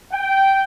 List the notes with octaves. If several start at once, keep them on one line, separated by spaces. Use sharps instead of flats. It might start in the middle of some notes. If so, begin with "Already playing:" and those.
G5